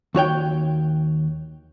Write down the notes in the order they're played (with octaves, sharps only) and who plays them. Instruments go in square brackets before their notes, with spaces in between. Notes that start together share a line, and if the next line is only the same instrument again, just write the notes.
[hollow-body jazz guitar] D#2 F#4 C#5 G5